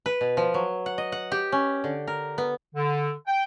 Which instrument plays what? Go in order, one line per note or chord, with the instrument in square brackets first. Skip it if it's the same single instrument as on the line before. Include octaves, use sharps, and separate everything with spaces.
[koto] B4
B2
F3
F#3
F#5
D#5
F#5
G4
C#4
D3
A#4
B3
[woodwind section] D3
G5